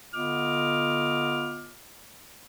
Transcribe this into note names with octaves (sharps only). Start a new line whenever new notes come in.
D3 B3 F4 D#5 D6 F6